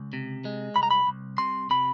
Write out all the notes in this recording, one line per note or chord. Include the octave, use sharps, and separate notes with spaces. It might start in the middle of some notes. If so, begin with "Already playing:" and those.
Already playing: C#2
C3
G#3
C2 B5
A#5
B5
C2
C3 C6
C3 B5